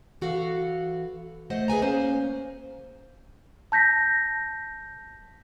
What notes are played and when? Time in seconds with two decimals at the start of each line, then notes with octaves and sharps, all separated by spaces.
0.21 E3 F#4 A4 F5
1.50 A3 C5 D#5 F#5
1.68 G#4 B4 G#5 A#5
1.82 A#3 C#4 C5
3.72 A5 G6 A#6 B6